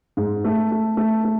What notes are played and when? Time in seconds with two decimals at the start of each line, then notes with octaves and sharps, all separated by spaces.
0.17 G#2
0.44 A3
0.72 A3
0.97 A3
1.24 A3